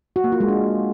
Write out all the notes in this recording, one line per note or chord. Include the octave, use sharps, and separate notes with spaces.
F#4
A#3
F4
G#3
D4